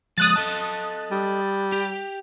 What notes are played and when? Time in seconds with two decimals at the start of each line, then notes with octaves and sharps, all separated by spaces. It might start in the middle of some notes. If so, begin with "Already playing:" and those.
0.18 F3 G#3 D#6 F#6 A6
0.36 A4 D#5 A5
1.11 G3
1.72 G4